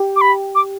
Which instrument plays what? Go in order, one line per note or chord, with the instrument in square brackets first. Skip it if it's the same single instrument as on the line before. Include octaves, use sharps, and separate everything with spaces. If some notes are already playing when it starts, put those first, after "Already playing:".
Already playing: [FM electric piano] G4
[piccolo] D6
B5
D6